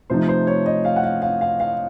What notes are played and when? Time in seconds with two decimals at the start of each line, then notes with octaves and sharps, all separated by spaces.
0.10 C3 F3 A3 D#4 C5
0.29 C5
0.47 C#5
0.66 D#5
0.85 F5
0.96 F#5
1.03 F5
1.22 F5
1.41 F5
1.60 F5